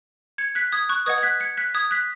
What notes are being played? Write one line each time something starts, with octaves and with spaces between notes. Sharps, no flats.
G#6 C#7
F#6 B6
D#6 G#6
C#6 F#6
B4 D#5 F#5 D#6 G#6
G#6
F#6 B6
G#6 C#7
F#6 B6
D#6 G#6
F#6 B6